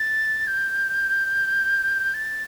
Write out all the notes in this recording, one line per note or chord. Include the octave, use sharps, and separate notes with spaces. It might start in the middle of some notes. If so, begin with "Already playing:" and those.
Already playing: A6
G6
A6